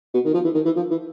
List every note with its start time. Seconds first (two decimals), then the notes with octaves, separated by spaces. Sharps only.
0.14 B2
0.25 D#3
0.34 F3
0.44 E3
0.55 D#3
0.65 E3
0.76 F3
0.91 E3